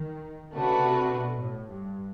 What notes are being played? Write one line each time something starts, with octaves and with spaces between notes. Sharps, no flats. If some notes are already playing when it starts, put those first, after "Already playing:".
Already playing: D#3
C#3 A3 D4 F#4 B4
C3
B2
A2
G2